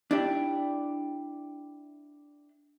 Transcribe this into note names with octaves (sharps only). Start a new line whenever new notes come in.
D4 E4 G4